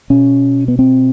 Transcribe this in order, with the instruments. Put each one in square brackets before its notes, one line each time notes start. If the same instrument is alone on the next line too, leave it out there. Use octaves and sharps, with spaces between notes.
[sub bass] B2 [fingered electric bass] C#4
[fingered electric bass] B3
C4